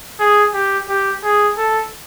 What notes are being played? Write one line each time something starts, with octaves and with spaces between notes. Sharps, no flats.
G#4
G4
G4
G#4
A4